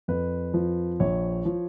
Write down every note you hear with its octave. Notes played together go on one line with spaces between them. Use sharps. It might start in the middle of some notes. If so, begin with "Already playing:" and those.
F2 B4
F3
A#1 C#5
F3